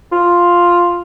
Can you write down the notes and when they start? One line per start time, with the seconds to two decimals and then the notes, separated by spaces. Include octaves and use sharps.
0.12 F4